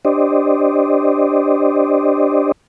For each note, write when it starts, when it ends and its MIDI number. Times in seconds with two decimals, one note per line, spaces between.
0.05 2.52 62
0.05 2.52 67
0.05 2.52 72
0.05 2.52 74
0.05 2.52 75